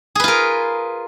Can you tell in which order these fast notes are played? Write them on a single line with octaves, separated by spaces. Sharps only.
G#4 B4 F4 A#4